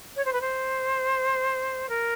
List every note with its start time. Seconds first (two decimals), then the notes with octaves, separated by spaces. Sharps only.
0.16 C#5
0.25 C5
0.33 B4
0.41 C5
1.89 A#4